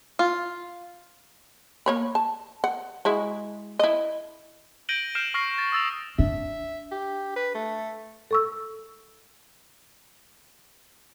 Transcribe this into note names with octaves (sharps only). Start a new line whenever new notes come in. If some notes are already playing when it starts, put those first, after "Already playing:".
F4
A#3 C#5 B5
A5
F#5
G#3 E4 F#4
E4 D#5
G6 A#6 D7 D#7 F#7 G7
F6 G6 C7 D7 E7
C#6 F6 A#6 C7 F#7
A6
D#6 E6 A6 E7 F7
D4 E5
G4
B4
A3
A4 C#6 E6